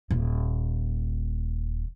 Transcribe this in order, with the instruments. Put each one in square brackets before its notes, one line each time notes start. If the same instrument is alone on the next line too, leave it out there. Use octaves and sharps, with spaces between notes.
[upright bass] D#1 A#2